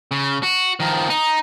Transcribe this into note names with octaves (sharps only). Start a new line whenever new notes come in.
C#3
F#4
D#3 F3
D#4